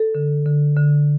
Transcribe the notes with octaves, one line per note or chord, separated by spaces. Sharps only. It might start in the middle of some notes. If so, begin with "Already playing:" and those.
Already playing: A4
D3
D3
D3